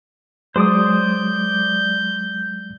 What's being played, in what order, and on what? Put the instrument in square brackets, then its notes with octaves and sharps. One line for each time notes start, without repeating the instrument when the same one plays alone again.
[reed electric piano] F#3 G#3 [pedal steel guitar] C5 D5 D#6 [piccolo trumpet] G6